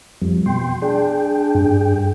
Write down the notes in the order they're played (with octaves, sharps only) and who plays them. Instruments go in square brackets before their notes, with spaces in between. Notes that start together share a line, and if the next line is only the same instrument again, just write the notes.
[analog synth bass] F2 [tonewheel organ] F3 G3
[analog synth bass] B2 [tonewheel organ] G5 C6
[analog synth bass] D4 [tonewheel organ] G#4 G5
[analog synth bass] G2